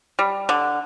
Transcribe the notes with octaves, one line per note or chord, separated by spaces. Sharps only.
G3
D3